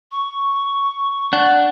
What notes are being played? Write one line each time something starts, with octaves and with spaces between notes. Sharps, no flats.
C#6
D4 F#5